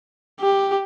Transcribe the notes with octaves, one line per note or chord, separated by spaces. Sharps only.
G4